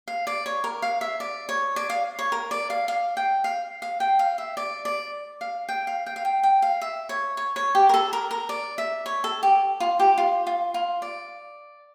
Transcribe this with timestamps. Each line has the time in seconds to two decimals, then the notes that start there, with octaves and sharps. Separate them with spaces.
0.08 F5
0.27 D5
0.46 C#5
0.64 A#4
0.82 F5
1.01 E5
1.20 D5
1.49 C#5
1.76 D5
1.90 F5
2.19 C#5
2.32 A#4
2.51 D5
2.70 F5
2.88 F5
3.17 G5
3.44 F5
3.82 F5
4.00 G5
4.19 F5
4.38 E5
4.57 D5
4.85 D5
5.41 F5
5.69 G5
5.87 F5
6.06 G5
6.16 F5
6.25 G5
6.43 G5
6.62 F5
6.81 E5
7.09 C#5
7.37 C#5
7.56 C#5
7.75 G4
7.89 A#4
7.94 A4
8.13 A#4
8.31 A#4
8.49 D5
8.78 E5
9.06 C#5
9.24 A4
9.43 G4
9.80 F4
10.00 G4
10.18 F4
10.47 F4
10.74 F4
11.02 D5